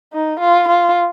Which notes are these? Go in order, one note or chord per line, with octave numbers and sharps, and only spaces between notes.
D#4
F4
F4